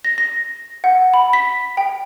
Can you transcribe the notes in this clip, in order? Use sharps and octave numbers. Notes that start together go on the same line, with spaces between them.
A#6
A#6
F#5
B5
B6
G5